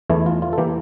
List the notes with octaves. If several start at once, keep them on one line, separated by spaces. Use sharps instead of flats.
E2 E3 A3 E4
F4
F4
A4
E3 A#3 G4